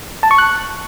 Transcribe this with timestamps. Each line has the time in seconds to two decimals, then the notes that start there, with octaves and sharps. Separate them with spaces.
0.23 A5
0.31 C#6
0.38 F#6